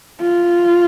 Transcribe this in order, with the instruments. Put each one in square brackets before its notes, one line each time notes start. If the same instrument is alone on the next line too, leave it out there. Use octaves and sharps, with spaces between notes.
[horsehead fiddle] F4